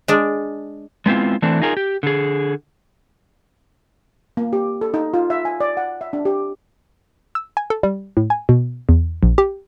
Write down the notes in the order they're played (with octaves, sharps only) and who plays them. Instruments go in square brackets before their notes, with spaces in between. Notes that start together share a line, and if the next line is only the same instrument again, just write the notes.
[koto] G#3 D4
[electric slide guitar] G#3 B3 C4 E4 F4
E3 A3 C4 D4
D#4 F4 G#4 A#4
G4
D3 G#4
[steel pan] A#3
G4
A4
D#4
F4
E5
G#5
D5
F#5
E5
D4
G4
[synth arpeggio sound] E6
G#5
A4
G3
A2
G#5
B2
E2
A#1
G4